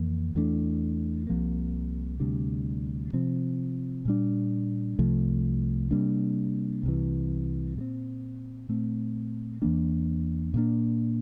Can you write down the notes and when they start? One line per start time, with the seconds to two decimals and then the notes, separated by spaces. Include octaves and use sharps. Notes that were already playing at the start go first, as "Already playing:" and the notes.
Already playing: F2 E3 A#3
0.35 E2 E3 A3 D4
1.27 C2 C3 F3 A#3
2.20 D2 C3 G3 D4
3.13 C3 F3 C4
4.05 A#2 G3 D4
4.99 C2 C3 F3 A3
5.91 C3 G3 A#3 D4
6.83 C2 C3 E3
7.76 A#2 G3
7.81 C4
8.69 A#2 A3 C4
9.62 E2 E3 A#3 D4
10.54 A#2 F3 A#3 D4